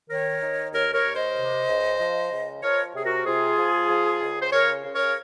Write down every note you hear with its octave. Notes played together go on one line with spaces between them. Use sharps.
D#3 A#4 C#5
D#3
D#2 A#4 C#5
A#4 C#5
D#2
C5 D#5
C3
C#2
F3
C#2
F3 A#4 C#5
C3 G#4
F#4 A#4
C3 F4 G#4
F3
F3
C#2
C5
C#3 A#4 C#5
C#3
A#4 C#5